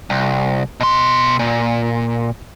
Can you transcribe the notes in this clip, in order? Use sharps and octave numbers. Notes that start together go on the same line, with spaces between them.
C2
B2 C6
A#2